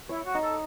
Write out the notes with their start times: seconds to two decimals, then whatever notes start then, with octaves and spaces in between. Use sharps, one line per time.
0.09 E4 C#5
0.25 F#4
0.34 D#4
0.43 A4